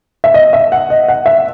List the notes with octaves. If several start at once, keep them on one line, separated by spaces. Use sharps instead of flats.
E5
D#5
E5
F#5
D#5
F#5
E5